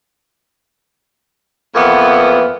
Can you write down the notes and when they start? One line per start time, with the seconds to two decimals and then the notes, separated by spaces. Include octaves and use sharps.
1.75 F2 E3 A#3 B3